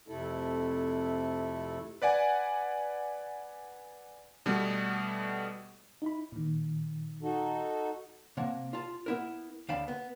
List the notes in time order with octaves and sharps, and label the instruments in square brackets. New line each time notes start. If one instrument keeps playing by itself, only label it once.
[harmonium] F2 C3 A3 E4 A4
[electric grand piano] B4 D5 F#5 G#5
B2 G3 A3 B3
[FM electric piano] D#4 E4 B5
A#2 D#3
[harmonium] D#4 F#4 A4
[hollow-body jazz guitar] C3 A#3 F#5 A5
F4 A5
B3 E4 A#4
D2 F5 G5 A5 B5
B3